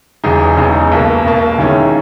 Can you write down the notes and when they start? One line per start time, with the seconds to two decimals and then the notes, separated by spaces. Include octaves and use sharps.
0.24 E1 E2 C#3 G#3 D#4
0.57 E1 E2 C#3 G#3 D#4
0.92 B1 B2 A#3
1.25 B1 B2 A#3
1.58 D#2 D#3 G#3 C#4 E4